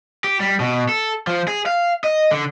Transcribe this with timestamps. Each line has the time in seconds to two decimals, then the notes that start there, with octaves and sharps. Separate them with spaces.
0.24 G4
0.40 G3
0.60 B2
0.89 A4
1.27 F3
1.47 G#4
1.66 F5
2.04 D#5
2.31 D3